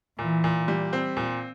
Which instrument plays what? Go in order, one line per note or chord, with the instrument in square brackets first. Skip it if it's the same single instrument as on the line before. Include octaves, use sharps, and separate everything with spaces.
[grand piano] A#2 [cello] E3
[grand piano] A#2
G3
C4
A#2